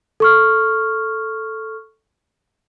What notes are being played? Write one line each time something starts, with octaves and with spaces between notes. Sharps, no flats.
A4 C#6 F6